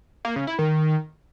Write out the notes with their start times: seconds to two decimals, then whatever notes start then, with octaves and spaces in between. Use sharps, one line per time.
0.25 A#3
0.36 C#3
0.47 E4
0.59 D#3